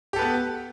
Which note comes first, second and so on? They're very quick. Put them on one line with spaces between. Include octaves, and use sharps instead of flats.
G4 A4 B4 B3